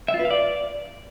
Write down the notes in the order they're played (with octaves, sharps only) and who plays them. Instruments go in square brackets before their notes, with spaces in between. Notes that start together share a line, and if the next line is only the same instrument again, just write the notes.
[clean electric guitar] E5
F4
B4
F5
D5